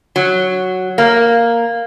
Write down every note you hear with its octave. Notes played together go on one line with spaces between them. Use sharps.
F#3
A#3